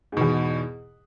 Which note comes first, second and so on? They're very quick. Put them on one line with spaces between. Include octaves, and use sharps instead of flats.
G#2 B2 E2